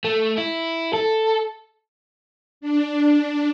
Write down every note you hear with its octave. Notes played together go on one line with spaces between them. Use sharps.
A3
E4
A4
D4